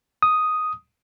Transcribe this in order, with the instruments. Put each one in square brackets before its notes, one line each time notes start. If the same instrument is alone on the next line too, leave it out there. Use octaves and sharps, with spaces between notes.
[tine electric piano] D#6